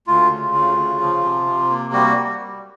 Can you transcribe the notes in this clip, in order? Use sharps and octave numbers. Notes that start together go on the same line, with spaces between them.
D2 F4
C#3
D2
C#3
F3
C3
C3
A#3
G3 F#4
G3